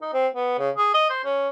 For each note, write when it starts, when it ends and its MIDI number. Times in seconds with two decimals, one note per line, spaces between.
0.02 0.10 63
0.14 0.28 60
0.35 0.57 59
0.59 0.70 49
0.76 0.92 68
0.94 1.10 75
1.10 1.20 72
1.25 1.49 61